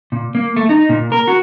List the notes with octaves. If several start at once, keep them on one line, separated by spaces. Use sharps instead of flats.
A#2
A#3
A3
D#4
A#2
A#4
F#4